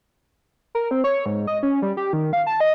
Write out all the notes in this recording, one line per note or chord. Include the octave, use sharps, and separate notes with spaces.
A#4
C4
C#5
G#2
D#5
C#4
G3
G4
D#3
F5
A5
D#5